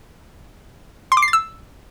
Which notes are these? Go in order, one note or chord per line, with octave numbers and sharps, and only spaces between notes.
C6
D6
C7
A6
E6